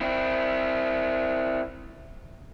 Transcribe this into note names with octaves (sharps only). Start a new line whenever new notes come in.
C4 E4